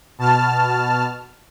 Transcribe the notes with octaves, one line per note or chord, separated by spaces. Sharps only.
B2 A5 F6